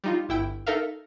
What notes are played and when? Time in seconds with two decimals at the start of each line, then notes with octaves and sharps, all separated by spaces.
0.04 G3 D#4 F4
0.29 G1 E4 G5 E6 D7
0.66 D#4 A4 A#4 E5 F5